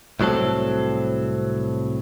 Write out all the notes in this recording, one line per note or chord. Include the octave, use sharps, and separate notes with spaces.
C2 A2 F#3 C4 A4